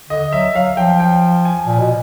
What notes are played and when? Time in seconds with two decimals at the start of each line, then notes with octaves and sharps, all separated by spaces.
0.09 D3 D#5
0.32 F#3 E5
0.55 F#3 F5
0.77 F3 G5
1.00 G5
1.45 G#5
1.66 A#2
1.79 B2